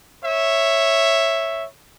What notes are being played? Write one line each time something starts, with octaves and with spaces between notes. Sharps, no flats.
C#5 E5